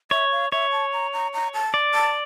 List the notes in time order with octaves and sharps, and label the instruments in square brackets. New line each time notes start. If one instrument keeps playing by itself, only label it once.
[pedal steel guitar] C#5 [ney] E5
[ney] F5
[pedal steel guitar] C#5 [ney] E5
[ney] A5
A#5
A#5
A#5
A5
[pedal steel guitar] D5
[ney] A5